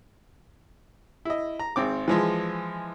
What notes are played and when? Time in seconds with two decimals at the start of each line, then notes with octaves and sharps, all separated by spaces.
1.25 E4 D#5
1.59 A#5
1.76 G#1 C4 D6
2.08 E3 F3 G#3